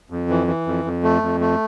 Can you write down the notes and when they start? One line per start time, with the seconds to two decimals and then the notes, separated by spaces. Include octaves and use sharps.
0.10 F2
0.29 E3
0.47 E3
0.66 F2
0.85 F2
1.03 A3
1.22 F2
1.40 A3